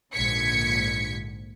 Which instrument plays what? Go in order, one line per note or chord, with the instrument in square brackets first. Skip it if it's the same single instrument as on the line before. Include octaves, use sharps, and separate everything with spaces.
[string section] A#1 G#2 D3 G#6 B6 C#7